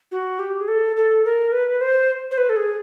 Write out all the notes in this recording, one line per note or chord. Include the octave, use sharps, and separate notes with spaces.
F#4
G4
G#4
A4
A4
A#4
B4
C5
C5
B4
A4
G#4